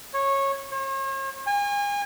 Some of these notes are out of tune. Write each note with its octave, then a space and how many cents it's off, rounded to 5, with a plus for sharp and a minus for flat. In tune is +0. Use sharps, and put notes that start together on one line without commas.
C#5 -15
C#5 -45
G#5 -35